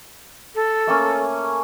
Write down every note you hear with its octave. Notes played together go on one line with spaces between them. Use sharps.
A4
A3 A#3 C#4